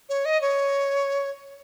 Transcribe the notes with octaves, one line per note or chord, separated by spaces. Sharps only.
C#5
D#5
C#5